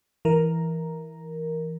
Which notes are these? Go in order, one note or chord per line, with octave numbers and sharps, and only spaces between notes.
E3 A#4